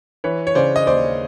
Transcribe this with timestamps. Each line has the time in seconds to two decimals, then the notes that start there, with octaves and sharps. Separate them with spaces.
0.24 E3 B4 C#5
0.47 C#5
0.55 C#3 C5 D5
0.76 D#5
0.87 D#2 C5 D5